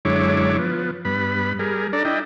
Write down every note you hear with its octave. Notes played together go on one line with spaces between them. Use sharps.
F#2 D3 G#3 E4 C#5 D6
F3 B3
G2 B3 B5
G3 G#4 A#4
D4 A4 D5 A#5
D4 E4 D#5 G5